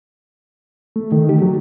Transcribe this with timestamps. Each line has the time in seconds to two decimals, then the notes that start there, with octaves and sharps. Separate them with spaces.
0.96 A3
1.12 D#3
1.29 G4
1.42 F#3